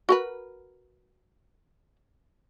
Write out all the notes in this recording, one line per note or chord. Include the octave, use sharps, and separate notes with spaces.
F#4 A#4 B4